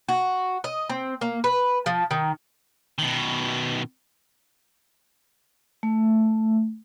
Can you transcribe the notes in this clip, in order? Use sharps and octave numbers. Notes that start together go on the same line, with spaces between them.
F#4
D#5
C4
A#3
B4
F3
D#3
B2 D#3
A3